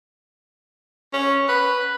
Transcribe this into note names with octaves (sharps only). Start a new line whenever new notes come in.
C#4
B4